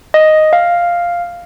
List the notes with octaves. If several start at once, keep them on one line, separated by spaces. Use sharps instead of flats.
D#5
F5